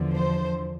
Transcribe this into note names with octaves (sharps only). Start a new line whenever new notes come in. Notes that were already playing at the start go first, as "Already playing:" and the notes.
Already playing: E2 D3 F3
C5